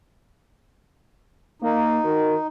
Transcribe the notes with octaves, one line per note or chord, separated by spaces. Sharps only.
A#3 D#4
D#3 F#4 A#4